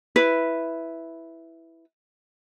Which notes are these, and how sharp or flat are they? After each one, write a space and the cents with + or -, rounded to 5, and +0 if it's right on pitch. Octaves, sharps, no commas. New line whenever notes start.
E4 +0 B4 +0